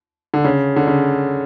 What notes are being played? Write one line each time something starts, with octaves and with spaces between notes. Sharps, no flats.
D3
C#3
D3
C#3